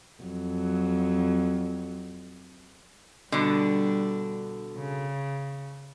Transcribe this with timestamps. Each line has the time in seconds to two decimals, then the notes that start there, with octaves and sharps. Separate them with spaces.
0.23 F2 F#3
3.32 B2 D3 G3 D4
4.77 C#3